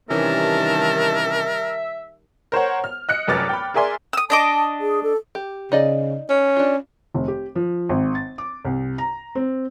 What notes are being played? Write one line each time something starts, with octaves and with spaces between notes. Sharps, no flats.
C3 D#3 E3 G3 C#4 A#4 E5 A5
A#4 C5 C#5 F#5
F6
D#5 F#6 C#7
F1 F#2 B4 D6 F6 A6
G5 B5
G#4 A#4 D5 E5 G#5 C6
D#6 E6
D4 D#5 A5 D6
G#4
A4
G4
C#3 D#4 D5 D#5
C#4
D4 F4
F1
G4
F3
G#1
A6
D6
C2
A#5
C4